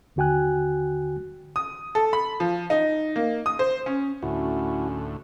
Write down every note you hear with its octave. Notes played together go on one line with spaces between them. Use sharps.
D#2 D3 F#4 G5 G#5 F#6
D#6
A4
B5
F3
D#4
A#3
D#6
C5
C#4
D2 A2 C#4 E4 F#4